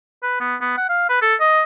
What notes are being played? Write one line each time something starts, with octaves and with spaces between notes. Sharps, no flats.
B4
B3
B3
F#5
F5
B4
A4
D#5